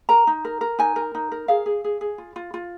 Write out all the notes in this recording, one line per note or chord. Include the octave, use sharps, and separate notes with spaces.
A#4 A#5
D#4
A#4
A#4
D#4 G#5
A#4
D#4
A#4
G#4 F5
G#4
G#4
G#4
F4
F4
F4